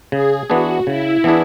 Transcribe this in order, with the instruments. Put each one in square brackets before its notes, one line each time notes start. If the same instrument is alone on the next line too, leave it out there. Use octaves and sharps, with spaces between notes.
[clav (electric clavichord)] C#3 [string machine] G#4
[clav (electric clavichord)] E3 B3 D4 G#4 [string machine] F#4
[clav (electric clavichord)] C#3 [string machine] E4
[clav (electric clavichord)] E3 B3 D4 G#4